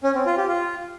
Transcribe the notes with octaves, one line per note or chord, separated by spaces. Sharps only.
C#4
C4
F4
G4
F4